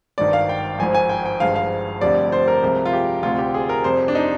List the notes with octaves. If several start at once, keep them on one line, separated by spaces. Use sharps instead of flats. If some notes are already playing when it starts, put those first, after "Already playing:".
G#1 G2 D#3 D5
F5
G5
G#1 G#2 F3 G#5
G#5
G5
G5
G#1 G2 F3 G#3 F5
F5
F1 F2 D3 G3 D5
C5
A#4
C2 C3 F3 G#3
F4
G4
D2 C3 G3 F4
G4
G#4
A#4
F2 C3 G3 C5
D4
D#4